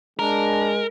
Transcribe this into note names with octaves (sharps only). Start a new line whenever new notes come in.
G#3 D4 A#4